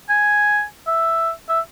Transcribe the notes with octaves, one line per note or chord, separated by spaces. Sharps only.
G#5
E5
E5